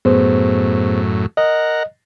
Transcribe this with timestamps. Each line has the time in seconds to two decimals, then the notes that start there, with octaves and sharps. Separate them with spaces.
0.05 F#2 A2 B3 G#4 C5
1.37 A#4 D#5 F#5